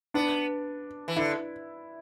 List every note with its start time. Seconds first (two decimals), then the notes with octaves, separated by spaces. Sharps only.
0.14 B3 D4
1.08 E3
1.16 D3 E4